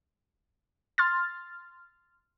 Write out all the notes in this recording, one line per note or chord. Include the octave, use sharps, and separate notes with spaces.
C6 F6 A6